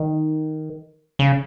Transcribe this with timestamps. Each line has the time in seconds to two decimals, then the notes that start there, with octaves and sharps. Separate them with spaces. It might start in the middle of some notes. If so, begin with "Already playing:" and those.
Already playing: D#3
1.19 C#3